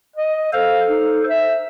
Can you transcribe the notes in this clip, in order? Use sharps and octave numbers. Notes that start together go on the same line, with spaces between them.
D#5
A4 C5 F5
D#4
E5